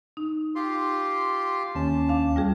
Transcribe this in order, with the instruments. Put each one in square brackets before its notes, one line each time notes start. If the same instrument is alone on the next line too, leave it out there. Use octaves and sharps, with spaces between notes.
[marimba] D#4
[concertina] F4 G4 C6
[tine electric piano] D#2 C#4 [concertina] A5
[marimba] D2 F5 D6
G3 F4 G#4